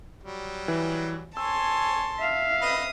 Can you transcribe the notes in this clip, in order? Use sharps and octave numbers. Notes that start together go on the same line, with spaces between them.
F#3 G3
E3
C#5 G#5 A5 C6 E6
E5 F5
B4 D#5 B5 D#6